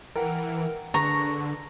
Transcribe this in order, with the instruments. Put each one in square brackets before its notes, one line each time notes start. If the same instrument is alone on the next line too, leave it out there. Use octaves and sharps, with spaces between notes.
[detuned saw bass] E3 [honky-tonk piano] A#4 [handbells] F#5 G5 A#5
[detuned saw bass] D3 [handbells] D4 G#4 B4 [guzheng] A#5 [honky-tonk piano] C#6